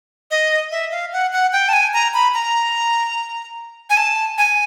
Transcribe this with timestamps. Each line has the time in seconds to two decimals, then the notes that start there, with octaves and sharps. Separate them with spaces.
0.31 D#5
0.71 E5
0.91 F5
1.13 F#5
1.33 F#5
1.53 G5
1.69 A5
1.73 G#5
1.93 A#5
2.14 B5
2.34 A#5
3.90 G#5
3.97 A5
4.38 G#5